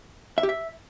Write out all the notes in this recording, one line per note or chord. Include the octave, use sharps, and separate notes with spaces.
E5
G4
E5